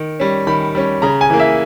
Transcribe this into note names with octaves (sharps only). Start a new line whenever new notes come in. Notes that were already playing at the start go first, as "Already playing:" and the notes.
Already playing: D#3
G3 C#4
D#3 B5
G3 C#4
C#3 A#5
G#5
E3 A#3
E5